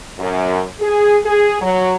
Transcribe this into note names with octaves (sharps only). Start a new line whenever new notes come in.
F#2
G#4
G#4
F#3